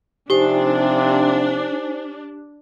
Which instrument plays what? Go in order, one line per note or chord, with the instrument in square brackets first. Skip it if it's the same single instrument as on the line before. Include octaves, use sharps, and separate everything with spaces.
[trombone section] C3 F3 [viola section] D4 [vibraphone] D#4 C5 G#5 [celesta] G4